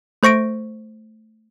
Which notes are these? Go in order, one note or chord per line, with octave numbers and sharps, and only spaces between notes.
A3 C5 C#6 A#6 D7